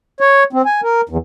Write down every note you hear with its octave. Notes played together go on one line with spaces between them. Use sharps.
C#5
C4
G#5
A#4
E2